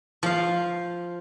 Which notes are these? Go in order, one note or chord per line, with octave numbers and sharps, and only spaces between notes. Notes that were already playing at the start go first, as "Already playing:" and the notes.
F3 F5